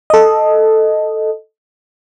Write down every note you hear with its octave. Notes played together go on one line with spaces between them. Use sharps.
A4 D#5